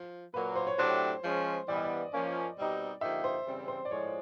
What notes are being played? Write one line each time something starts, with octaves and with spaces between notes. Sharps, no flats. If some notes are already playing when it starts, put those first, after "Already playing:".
Already playing: F3
A#2 F#3 A#3 B4
C5
C#5
A2 F#3 A3 D4 G4 C5
F3 G#3 C#4
E3 G3 B3 D5
D#5
D5
F3 A#3 C#4
B2 G3 C4 D#4 G4
D3 F3 A#3 D#4 G4 E5
C5
C#3 E3 G3 C4
C5
D5
A2 F3 G#3 C#5